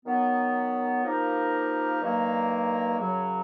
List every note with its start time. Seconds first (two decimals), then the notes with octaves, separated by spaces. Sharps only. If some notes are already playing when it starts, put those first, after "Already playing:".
0.05 D#3 F#3 B3
1.03 F3 A#3 D#4 G4 A#4
2.01 G2 D#3 F#3 A#3
2.99 F#2 C#3 F#3